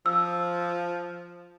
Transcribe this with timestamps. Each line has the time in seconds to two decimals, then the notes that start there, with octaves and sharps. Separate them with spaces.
0.06 F3 E6